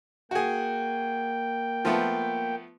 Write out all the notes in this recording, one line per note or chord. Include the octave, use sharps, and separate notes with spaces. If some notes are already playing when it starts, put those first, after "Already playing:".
A#3 F#4 G#4 G5
F3 A3 B3